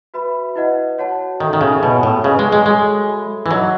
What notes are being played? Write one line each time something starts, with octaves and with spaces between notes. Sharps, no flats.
F#4 B4 E5 B5
E4 B4 D#5 F#5
F#4 C#5 F#5 A5
D#3 D#4 A4 E5
D#3
C#3
B2 C#5 G#5 B5
A2
C#3 G#4 B4 D#5 G#5 C#6
G#3
G#3
G#3 F#4 A4 C#5 G#5
A4 E5 B5
E3
F#3 D#4 G#4 D#5 F#5